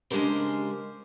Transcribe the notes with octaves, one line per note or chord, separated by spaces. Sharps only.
C#3 G#3 D4 G4 A#4 C5